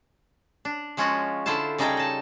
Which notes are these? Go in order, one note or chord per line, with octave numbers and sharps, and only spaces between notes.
D4
F3 G#3 C#4 F4 F#4
D3 E4 F4 C5 A5
C#3 G3 D#4 G#4 A4 G5
D#5 A5